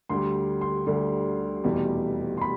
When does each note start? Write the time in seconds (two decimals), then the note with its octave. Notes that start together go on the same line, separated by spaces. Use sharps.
0.09 D2 D3 G3 C6
0.61 C6
0.86 D2 D3 G3
1.64 F1 E2 B2 G3
2.37 C6
2.41 B5